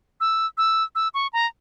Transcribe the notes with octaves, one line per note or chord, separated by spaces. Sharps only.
E6
E6
E6
C#6
A#5